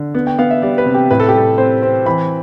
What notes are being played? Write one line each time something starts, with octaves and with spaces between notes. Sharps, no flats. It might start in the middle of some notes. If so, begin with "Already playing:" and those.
Already playing: D3
B3
G5
B3 F5
E5
G3 D5
B4
C3
G4
A2 B4
A4
G4
G3 A4
C4 C5
C4
E3 B5